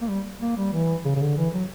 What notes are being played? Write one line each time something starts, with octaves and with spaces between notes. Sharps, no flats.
A#3
G3
A#3
G3
E3
C#3
C#3
D3
E3
F#3